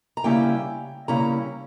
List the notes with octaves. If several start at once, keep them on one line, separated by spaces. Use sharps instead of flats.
A#5
C#3 G3 A#3 C#4 E4 G5
C#3 G3 A#3 C#4 E4 A#5